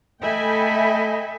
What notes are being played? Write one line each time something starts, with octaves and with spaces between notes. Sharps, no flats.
A3 A4 D#5 E5 G5 G#5 B5